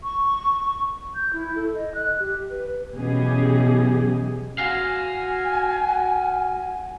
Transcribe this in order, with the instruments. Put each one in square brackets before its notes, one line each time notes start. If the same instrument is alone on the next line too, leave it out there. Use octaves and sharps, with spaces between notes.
[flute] C#6
G6
E4
A4
D#5
F#6
G4
B4
[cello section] B2 E3 F#3 C#4 G4 G#4
[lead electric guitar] F#4 F5 [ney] G#5